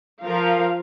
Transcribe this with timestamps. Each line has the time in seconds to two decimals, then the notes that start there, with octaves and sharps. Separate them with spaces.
0.22 F3 A#4 F5